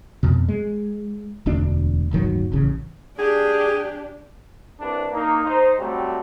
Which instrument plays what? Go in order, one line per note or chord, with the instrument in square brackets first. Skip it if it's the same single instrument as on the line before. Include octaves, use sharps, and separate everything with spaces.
[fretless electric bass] F2 B2
G#3
E1 D2 D4
D1 G1 D#3 F#3
D1 A1 C#3
[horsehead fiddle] D4 [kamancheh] G4 [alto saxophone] G#4
[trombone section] C2 D4 B4
A#3 D#4
D#4 C5
F#3 G3 A3 C4 G4